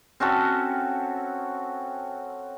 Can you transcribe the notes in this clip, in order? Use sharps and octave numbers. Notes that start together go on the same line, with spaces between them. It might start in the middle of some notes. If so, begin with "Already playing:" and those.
C4 C#4 F#4 A4